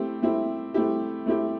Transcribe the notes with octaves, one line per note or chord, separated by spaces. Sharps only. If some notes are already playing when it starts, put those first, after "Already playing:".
Already playing: A3 C4 E4 G4
A3 C4 E4 G4
A3 C4 E4 G4
A3 C4 E4 G4